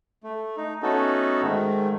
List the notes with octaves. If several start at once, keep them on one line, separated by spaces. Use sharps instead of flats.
A3
D#4
A3 B3 C#4 D#4 F#4 A4
G#2 D#3 A3